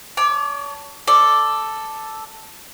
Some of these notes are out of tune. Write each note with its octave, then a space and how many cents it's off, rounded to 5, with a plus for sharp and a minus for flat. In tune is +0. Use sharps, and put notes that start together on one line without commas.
C#5 +35 A5 +0 D6 +0
A4 +0 D5 +0